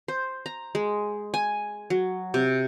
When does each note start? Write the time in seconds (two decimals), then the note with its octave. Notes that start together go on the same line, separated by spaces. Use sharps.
0.08 C5
0.46 A#5
0.75 G#3
1.34 G#5
1.90 F#3
2.34 C3